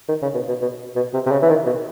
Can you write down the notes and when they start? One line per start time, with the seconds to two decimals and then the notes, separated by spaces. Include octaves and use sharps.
0.09 D#3
0.22 C#3
0.34 B2
0.48 B2
0.61 B2
0.96 B2
1.14 C3
1.26 C3
1.32 C#3
1.42 E3
1.49 D#3
1.66 B2